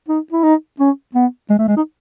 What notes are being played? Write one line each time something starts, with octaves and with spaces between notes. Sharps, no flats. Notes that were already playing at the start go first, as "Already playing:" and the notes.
D#4
E4
D#4
C#4
B3
G#3
A3
G#3
D#4